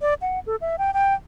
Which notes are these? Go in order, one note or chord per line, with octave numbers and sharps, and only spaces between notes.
D5
F#5
A4
E5
G5
G5